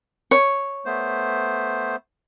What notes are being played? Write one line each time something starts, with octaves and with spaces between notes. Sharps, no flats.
C#5
A3 B3 C5